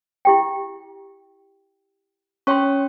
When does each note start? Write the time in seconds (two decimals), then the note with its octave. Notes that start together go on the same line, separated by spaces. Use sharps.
0.25 E4 G4 G5
2.47 C#4 C#5 G5 C6 C#6